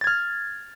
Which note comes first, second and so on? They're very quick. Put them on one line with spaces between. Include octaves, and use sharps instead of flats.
A6 G#6 F6